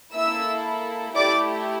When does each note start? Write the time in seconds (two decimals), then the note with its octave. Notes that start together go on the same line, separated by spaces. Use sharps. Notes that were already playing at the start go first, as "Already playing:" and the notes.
0.13 A#3 E4 A4 E5 E6
1.16 A3 E4 G4 D5 D6